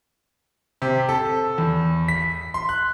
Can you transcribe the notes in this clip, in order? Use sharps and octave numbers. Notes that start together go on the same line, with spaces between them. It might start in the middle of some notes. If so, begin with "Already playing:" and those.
C3
A4
E2
B6
C6
F#6